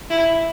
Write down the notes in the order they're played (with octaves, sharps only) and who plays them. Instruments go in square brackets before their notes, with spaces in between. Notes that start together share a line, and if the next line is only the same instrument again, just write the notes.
[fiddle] E4